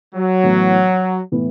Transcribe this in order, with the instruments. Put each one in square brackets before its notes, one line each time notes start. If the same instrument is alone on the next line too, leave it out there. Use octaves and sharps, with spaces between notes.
[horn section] F#3
[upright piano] A2 E3 B3
A2 E3 B3